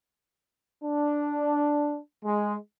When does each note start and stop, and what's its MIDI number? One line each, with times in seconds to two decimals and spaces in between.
0.84 1.99 62
2.24 2.57 56